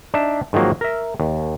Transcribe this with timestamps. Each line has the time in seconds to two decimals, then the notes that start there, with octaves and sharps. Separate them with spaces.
0.14 D4 D#4 E5
0.53 G#2 D#3 F3 F#3 A#3
0.81 A#4 E5
1.20 D#2